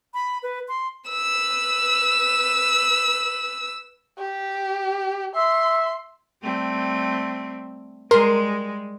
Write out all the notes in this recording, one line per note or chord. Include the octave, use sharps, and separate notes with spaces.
B5
B4
C6
B4 E6
G4
E5 C6
G3 A3 C4
G3 G#3 A#4 C6